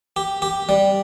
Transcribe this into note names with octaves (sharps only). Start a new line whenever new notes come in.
G4
G4
G3